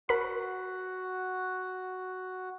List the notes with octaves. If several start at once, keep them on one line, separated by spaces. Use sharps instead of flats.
F#4 A#4 B5